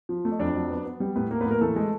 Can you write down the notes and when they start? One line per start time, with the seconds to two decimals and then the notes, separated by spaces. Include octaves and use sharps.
0.09 F3
0.25 A3
0.32 D#5
0.39 F2 D4 D5
0.55 F#3
0.70 B3
0.85 B3
1.00 G3
1.16 A2 B3 B4
1.31 A#3 A#4
1.41 B3 B4
1.46 A2 A#3 A#4
1.61 E3 A3 A4
1.76 G#3